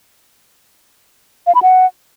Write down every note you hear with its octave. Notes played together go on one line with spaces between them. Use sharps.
F5
B5
F#5